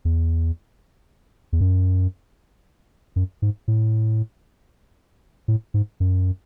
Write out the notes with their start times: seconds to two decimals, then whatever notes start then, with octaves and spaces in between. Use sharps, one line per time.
0.05 E2
1.53 E2
1.61 F#2
3.16 F#2
3.42 G#2
3.68 A2
5.48 A2
5.74 G#2
6.00 F#2